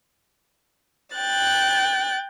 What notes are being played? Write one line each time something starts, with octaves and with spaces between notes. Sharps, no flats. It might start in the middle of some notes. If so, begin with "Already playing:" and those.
G5 F#6 A6